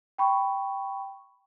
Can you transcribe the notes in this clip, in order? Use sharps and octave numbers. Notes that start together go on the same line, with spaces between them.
G5 B5 C#6